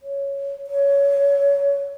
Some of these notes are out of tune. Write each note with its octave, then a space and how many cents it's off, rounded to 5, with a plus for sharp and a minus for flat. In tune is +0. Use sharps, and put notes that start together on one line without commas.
C#5 +5
C#5 +20